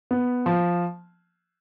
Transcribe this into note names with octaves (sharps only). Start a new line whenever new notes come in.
B3
F3